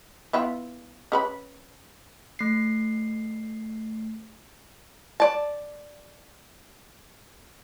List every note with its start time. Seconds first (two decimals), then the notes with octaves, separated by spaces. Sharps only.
0.33 B3 E4 F4
1.12 C#4 B4 B5
2.39 A3 C7
5.20 D5 A5